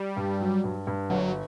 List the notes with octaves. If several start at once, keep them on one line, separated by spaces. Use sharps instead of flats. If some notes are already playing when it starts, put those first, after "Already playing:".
Already playing: G3
G2
F#3
G2
G2
G1 F#3